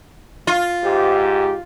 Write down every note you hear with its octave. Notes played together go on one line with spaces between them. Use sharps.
F4
G#2 G4